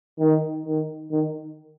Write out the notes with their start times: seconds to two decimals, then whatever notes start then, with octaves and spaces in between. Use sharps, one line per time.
0.19 D#3
0.65 D#3
1.11 D#3